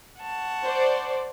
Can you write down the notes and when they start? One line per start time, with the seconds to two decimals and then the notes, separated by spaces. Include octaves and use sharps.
0.21 F#5 A5 C#6
0.63 C5 D5